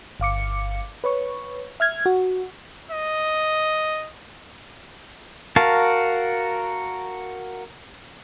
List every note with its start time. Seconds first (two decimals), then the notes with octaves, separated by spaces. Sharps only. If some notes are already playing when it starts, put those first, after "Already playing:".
0.20 G1 F5 D6 C#7
1.04 B4 C#5 C#6
1.80 E5 F6 G#6
2.06 F#4
2.91 D#5
5.56 F#4 A#4 F5 A5